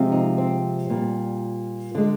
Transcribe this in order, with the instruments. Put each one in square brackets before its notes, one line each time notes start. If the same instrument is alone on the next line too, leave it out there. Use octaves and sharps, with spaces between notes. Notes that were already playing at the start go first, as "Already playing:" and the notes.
Already playing: [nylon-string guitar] C3 F3 G#3
D#4
C4
A#2 G3
D3 G#3